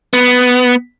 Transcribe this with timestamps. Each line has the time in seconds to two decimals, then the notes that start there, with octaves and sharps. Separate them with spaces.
0.13 B3